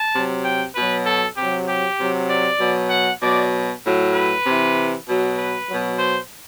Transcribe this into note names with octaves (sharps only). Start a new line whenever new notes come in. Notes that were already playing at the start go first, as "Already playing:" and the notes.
Already playing: A5
C3 F#3
G5
B2 B4
F#3
A4
C3 F#3 G4
G4
C3 F#3
D5
B2 F#3
F#5
B2 F#3 D5
A2 F#3
B4
C3 E3
B2 F#3
B4
B2 F#3
C5